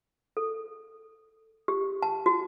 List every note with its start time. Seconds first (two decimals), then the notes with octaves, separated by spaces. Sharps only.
0.37 A4
1.68 G4
2.02 A5
2.26 F#4